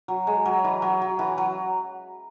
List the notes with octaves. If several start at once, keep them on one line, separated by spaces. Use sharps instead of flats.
F#3
G#3
F#3
E3
F#3
F#3
E3
F#3